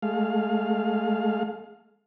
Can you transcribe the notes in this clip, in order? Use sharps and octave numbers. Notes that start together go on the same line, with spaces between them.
G#3 A3 F5